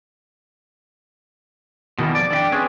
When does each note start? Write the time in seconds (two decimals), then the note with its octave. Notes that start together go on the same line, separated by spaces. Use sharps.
1.98 B2 D#3 E3 G3 A#3
2.15 F2 D5
2.30 D4 A4 E5 G5
2.52 C4 C#4 G#4 B4